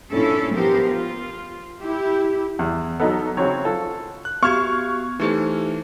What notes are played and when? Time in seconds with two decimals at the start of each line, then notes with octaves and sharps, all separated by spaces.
0.12 A#2 C#4 D4 E4 A4
0.54 F3 B3 G4 A#4 C5
0.88 F4
1.80 E4 G4
2.59 E2
3.00 F#3 B3 D#4 A4
3.37 C#3 F#3 C4 C#5
3.65 F4 A4
4.25 F#6
4.43 B3 F#4 G4 F5 C#6 F6 G#6
5.20 E3 A3 D#4 G4 C5